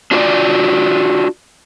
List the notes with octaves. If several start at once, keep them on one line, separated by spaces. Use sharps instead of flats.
D4 F4 F#4 A#4 D5